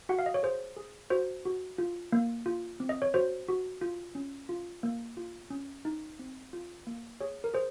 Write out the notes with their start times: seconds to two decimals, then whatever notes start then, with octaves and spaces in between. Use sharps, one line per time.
0.09 F#4 F#5
0.19 F5
0.26 D#5
0.34 C#5
0.43 G#4 C5
0.77 G#4
1.10 F#4 C5
1.45 F#4
1.78 F4
2.12 A#3
2.46 F4
2.80 C4
2.89 D#5
3.02 C#5
3.14 F#4 C5
3.49 F#4
3.81 F4
4.15 C#4
4.49 F4
4.83 A#3
5.17 F4
5.50 C#4
5.85 D#4
6.19 C4
6.53 F4
6.87 A#3
7.21 G#4 C#5
7.44 A#4
7.54 G#4 C5